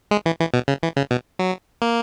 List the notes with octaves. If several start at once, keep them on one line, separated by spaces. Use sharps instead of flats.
G#3
E3
E3
B2
C#3
E3
C#3
B2
F#3
A#3